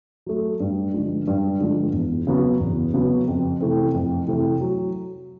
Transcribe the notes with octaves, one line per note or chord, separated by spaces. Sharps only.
F#3 A3
G2
D3 F3 G#3
G2
D3 F3 G#3
E2
C#3 F#3 B3
E2
C#3 F#3 B3
F2
C3 E3 A3 C4
F2
C3 E3 A3 C4
F#3